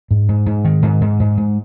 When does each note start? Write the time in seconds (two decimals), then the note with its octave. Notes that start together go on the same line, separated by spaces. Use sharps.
0.11 G#2
0.29 G#2
0.46 G#2
0.65 D#3
0.83 G#2
1.01 G#2
1.20 G#2
1.37 G#2